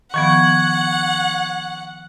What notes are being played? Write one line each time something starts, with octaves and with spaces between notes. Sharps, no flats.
D#3 F3 B3 F#5 C#6 G#6